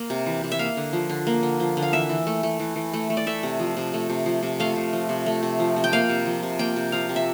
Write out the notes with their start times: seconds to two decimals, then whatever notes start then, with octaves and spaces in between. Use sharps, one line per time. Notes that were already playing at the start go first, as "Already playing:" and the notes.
Already playing: A#3
0.10 C3
0.26 E3
0.44 C3
0.52 E5
0.59 A#3 F5
0.77 D3
0.93 F3
1.10 D3
1.27 A#3
1.43 D3
1.60 F3
1.77 D3
1.82 F5
1.93 E3 E5
2.09 E3
2.27 A3
2.43 A3
2.60 E3
2.76 E3
2.93 A3
3.10 A3
3.17 D5
3.27 A3 E5
3.43 C3
3.60 F3
3.77 C3
3.93 A3
4.10 C3
4.26 F3
4.43 C3
4.60 A3 F5
4.76 C3
4.93 F3
5.09 C3
5.26 A3
5.43 C3
5.60 F3
5.76 C3
5.84 G5
5.92 A#3 F5
6.10 C3
6.26 F3
6.43 C3
6.59 A#3 G5
6.76 C3
6.92 F3 F5
7.09 C3
7.16 E5